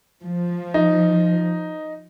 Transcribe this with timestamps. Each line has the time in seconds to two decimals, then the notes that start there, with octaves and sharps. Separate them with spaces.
0.24 F3
0.74 D#4